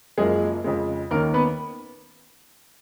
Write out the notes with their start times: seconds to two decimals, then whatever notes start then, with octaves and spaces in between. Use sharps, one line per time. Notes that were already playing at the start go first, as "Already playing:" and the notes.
0.18 F#1 F#2 F3 G#3 A#3 G#4
0.64 F2 C#3 G#3
1.11 D#2 D#3 A#3 C#4 A#4
1.34 B3 B4